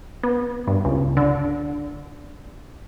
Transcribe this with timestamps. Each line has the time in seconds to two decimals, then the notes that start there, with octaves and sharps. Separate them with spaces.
0.23 B3
0.68 G2
0.85 C#2
1.17 D3